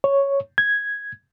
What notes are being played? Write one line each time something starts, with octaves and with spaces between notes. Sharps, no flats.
C#5
G#6